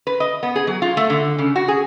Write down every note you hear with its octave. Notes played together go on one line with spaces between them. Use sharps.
B4
D#5
B3
G#4
F#3
F4
A3
D3
C#3
F#4
G#4